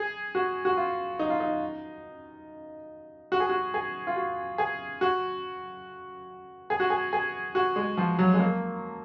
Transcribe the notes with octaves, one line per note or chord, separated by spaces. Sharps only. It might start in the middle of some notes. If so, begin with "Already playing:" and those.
Already playing: G#4
F#4
F#4
F4
D#4
F4
D#4
F#4
G#4
F#4
G#4
F4
F#4
G#4
F#4
G#4
F#4
G#4
G#4
F#4
G#3
F3
F#3
G#3
A#3